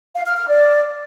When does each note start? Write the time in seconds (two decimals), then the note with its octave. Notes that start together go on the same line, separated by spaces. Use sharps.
0.15 F5
0.26 F6
0.37 F6
0.48 D5